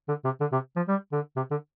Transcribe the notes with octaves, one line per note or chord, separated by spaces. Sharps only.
D3
C3
D3
C3
F3
G3
D3
C3
D3